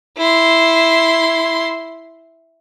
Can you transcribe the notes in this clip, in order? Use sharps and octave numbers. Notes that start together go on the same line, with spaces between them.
E4 C6